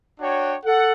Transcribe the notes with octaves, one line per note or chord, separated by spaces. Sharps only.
D4 F#4 C#5 G5
A4 F#5